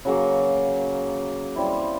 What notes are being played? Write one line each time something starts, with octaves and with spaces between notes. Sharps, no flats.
C#3 F#3 A#3
G3 C4 E4